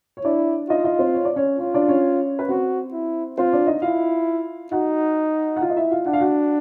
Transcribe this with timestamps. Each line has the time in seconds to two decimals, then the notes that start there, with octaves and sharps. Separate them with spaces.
0.17 C#5
0.24 D4 E4 D5
0.69 D#4 F4 D#5
0.84 D#4 D#5
0.99 C4 C5
1.14 C#5
1.25 D5
1.36 C#4 C#5
1.59 C#4 F4 C#5
1.74 D4 D5
1.88 C#4 C#5
2.39 B4
2.49 C4 F#4 C5
2.93 E4
3.38 C4 F4 C5
3.53 D4 D5
3.67 D#4 D#5
3.82 E4 F4 F5
4.72 D#4 F#4 F#5
5.57 F#5
5.61 F4 F5
5.70 D#5
5.76 E4 E5
5.91 F4 F5
6.06 D4 F#5
6.13 F5
6.20 F#4 F#5